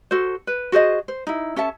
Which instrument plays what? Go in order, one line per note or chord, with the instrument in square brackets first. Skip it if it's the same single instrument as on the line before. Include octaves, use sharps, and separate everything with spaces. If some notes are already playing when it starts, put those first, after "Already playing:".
[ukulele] F#4 A4 C5
B4
F#4 G#4 C5 D#5
C5
D#4 E4
C#4 A4 E5 A5